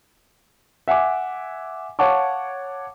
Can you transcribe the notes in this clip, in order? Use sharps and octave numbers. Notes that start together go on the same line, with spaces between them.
E5 F#5 G#5 D6
C#5 F5 F#5 A5 C#6 D6